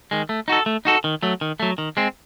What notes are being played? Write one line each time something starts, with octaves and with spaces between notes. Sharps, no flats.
D#3 G#3
A3
D#4 F#4 A4
A3
D#4 F#4 A4
D#3
F#3 A3
D#3
F#3 A3
D#3
G#3 C4